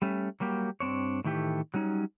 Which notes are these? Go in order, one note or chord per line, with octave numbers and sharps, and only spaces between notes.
G3 A3 C#4
F#3 G3 A#3 G4
G2 C4 D4 C#5
A2 D#3 E3 A3 G4
F#3 G3 C#4 D#4